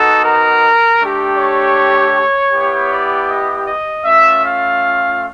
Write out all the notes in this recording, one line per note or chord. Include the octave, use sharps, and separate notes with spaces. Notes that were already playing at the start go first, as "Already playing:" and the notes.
Already playing: B3 D#4 F#4 A4
A#4
A3 D4 G4
C#5
B3 E4 G4
D5
D#5
D#5
A3 C#4 F4 E5
F5